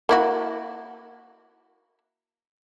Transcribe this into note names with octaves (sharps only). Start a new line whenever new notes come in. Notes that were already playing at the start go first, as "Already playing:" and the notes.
A#3 E4 F#4